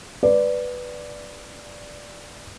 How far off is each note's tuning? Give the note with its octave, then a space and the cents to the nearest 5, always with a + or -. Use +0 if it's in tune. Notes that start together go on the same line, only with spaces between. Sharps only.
B4 +0 D5 +0